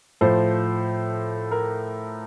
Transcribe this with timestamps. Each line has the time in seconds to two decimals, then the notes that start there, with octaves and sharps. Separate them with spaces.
0.21 A2 F3 C5
1.51 A#4